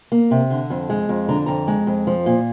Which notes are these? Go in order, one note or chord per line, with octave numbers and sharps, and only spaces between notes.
A#3
C3
D3
F2
G#3
F2
D3 A#5
F2 A#5
G#3
F2
F3
A#2